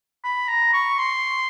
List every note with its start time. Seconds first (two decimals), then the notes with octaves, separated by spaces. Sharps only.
0.24 B5
0.49 A#5
0.73 C#6
0.99 C6